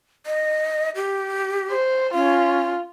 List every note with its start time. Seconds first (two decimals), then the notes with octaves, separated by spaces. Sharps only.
0.26 D#5
0.95 G4
1.71 C5
2.14 C#4 F4